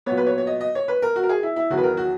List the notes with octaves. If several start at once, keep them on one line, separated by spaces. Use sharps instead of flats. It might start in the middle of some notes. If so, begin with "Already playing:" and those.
A#2 F#3 B3 C#5
B4
C#5
C#5
D#5
D#5
C#5
B4
A#4
F#4
A#4
G#4
E4
E4
E2 D#3 F#3 F#4
B4
A#4
F#4